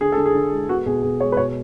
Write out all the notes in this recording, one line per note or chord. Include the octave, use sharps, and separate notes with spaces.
D3 G#4
D3 A4
G#4
D3
G#3
B3 F#4
B2 G#4
B2 G#4
G#3 C#5
B4
B2 C#5